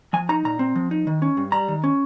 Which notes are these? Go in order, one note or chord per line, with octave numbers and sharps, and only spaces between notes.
F3 G#5
D#4 A#5
A#2 A#5
C4
F3
D#4
D#3
C#4
G2
G3 A#5
D#3
C#4